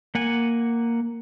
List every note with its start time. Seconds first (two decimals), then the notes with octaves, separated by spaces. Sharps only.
0.15 A#3 F#5 G#5